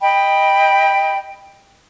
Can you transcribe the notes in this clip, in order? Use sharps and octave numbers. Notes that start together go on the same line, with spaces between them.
D#5 G5 B5